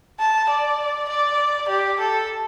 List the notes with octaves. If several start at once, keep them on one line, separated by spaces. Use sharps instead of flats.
A5
D5
D5
G4
A4